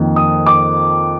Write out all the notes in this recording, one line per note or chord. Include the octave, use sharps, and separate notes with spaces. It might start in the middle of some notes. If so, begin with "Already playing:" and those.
Already playing: F2 D#3 A#3 D#4
D#6
D6